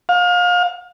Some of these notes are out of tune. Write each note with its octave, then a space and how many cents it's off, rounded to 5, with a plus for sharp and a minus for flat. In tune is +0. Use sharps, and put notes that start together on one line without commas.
F5 +30